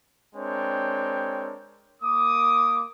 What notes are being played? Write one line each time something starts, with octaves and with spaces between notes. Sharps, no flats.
G#3 C4 D4 A#4 C#5 G5
A#3 D6 D#6